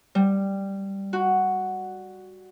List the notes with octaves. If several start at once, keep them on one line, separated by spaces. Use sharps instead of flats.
G3
F#4